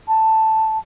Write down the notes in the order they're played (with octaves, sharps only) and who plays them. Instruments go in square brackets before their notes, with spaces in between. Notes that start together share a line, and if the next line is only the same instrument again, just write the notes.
[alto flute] A5